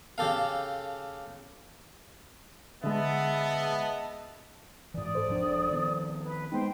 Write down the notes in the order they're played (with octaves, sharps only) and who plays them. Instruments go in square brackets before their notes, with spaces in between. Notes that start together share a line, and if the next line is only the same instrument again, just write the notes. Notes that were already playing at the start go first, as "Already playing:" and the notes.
[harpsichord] C#3 G4 A4 F5
[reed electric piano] D3 G#3 [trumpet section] B3 [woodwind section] G#4 D#5 A5 [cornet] E5
[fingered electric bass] G#2 E3 [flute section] D5 D#6
[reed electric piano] A4 C5
[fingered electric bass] E1 F3 D4
D#3 F3 B3
[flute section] B4
[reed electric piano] G#3 B3 D#4 [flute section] C5 G5